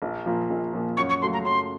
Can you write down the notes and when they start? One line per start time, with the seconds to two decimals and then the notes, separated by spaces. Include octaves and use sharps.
0.02 A#1
0.26 A#2 F3
0.50 A#1
0.73 A#2 F3
0.97 F#2 C#6
1.09 C#6
1.22 C#3 F#3 A3 C6
1.33 A#5
1.45 F#2 C6